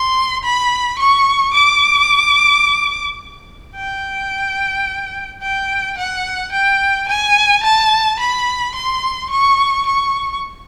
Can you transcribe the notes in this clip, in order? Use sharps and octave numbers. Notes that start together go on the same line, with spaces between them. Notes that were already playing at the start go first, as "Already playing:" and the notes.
Already playing: C6
B5
C#6
D6
G5
G5
F#5
G5
G#5
A5
B5
C6
C#6
C#6